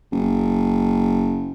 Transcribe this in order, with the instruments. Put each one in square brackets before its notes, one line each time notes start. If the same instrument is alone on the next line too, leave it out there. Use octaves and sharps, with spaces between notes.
[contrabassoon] F#1